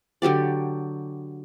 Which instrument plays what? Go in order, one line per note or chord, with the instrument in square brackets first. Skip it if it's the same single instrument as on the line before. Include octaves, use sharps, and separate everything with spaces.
[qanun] D3 F#3 G4 D5